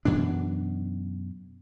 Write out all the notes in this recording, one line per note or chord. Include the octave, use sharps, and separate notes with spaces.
F#2 B2 E3 D4